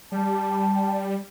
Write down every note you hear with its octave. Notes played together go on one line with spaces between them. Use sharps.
G3 A5